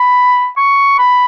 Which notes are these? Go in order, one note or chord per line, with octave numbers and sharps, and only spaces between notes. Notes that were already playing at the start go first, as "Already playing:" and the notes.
Already playing: B5
C#6
B5